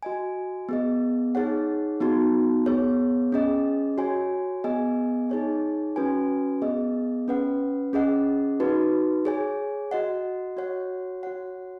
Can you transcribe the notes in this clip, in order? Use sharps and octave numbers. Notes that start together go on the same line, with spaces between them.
F#4 D#5 G#5
B3 G#4 D#5
D#4 G#4 C#5 F#5
B3 D#4 F#4
B3 G#4 C#5
C#4 G#4 D#5
F#4 C#5 G#5
B3 G#4 D#5 G#5
D#4 G#4 C#5 G#5
C#4 F#4 B4 G#5
B3 G#4 D#5
C#4 B4 F#5
C#4 G#4 D#5 F#5
D#4 F#4 B4
G#4 C#5 G#5
F#4 D#5 F#5
F#4 C#5 F#5
F#4 C#5 F#5